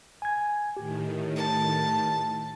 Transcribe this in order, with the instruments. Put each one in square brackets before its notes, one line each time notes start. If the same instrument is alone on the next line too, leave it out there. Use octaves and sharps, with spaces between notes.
[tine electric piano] G#5 G#6
[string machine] A2 D#3 [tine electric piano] G4
[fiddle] A5